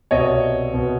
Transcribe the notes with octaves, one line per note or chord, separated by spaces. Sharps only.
C2 B2 C#5 D#5
C2 B2